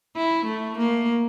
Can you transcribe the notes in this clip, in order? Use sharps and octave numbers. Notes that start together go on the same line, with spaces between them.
E4
A3
A#3